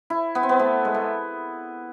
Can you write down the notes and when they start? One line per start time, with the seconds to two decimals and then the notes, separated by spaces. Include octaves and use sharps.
0.10 E4
0.35 B3
0.43 C4
0.49 B3
0.59 A3
0.85 G#3
0.94 A3